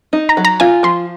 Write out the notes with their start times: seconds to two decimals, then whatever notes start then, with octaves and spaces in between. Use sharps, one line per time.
0.13 D#4
0.29 A#5
0.37 F#3
0.45 A#5
0.60 F4 G#5
0.83 F3 C6